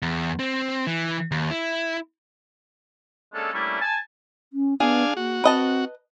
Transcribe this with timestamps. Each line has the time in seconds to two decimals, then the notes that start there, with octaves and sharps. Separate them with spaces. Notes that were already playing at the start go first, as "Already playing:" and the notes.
0.02 E2
0.39 C4
0.87 E3
1.31 D#2
1.51 E4
3.34 G#3 A#3 C#4 D4 A4
3.53 G3 A3 A#3 C#4 D4 E4
3.81 G#5 A5
4.53 C#4
4.80 B3 D4 G#4 F5 G#5
5.17 A#3 F#4
5.44 C4 B4 D#5 A5